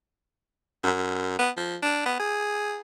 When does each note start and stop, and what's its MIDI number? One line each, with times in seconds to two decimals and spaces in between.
0.84 1.39 42
1.39 1.50 59
1.57 1.76 53
1.83 2.02 62
2.06 2.15 59
2.20 2.81 68